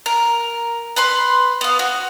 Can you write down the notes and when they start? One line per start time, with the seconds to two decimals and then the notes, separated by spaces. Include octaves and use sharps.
0.06 A#4
0.96 B4 B5 C6
1.61 B3 F5
1.79 F#4